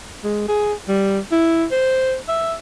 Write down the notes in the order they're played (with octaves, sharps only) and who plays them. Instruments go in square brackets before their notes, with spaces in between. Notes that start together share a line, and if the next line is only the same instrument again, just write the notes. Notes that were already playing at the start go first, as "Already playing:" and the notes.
[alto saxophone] G#3
G#4
G3
E4
C5
E5